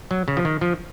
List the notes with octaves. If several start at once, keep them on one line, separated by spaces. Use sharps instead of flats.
F#3
C#3
F3
D#3
F3